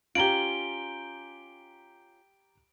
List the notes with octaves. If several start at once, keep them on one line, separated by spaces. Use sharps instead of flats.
C#4 F4 G4 A#5 D7 F#7 G7